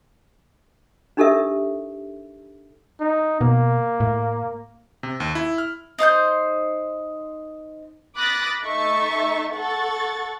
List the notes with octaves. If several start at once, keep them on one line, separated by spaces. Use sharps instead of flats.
D4 D#4 G4 A4 A#4 E5
D#4
B2 A#3
A2
C3
D#2
E4
F6
D#4 C5 C#6 G6
B5 D6 D#6 F#6 A6 A#6
A3 D#4 E5 C#6 A6
A4 F#5 C#6 A6